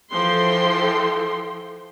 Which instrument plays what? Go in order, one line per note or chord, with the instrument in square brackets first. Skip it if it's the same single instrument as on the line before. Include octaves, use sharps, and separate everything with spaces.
[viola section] E3 F3 A4 G5 C6